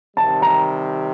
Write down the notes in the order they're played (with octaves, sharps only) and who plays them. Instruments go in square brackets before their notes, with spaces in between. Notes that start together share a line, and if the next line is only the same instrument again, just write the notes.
[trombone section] C3 D#3 G3 [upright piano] A5
[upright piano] A#5